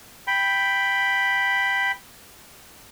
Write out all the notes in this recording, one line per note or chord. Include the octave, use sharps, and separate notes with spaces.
G5 B5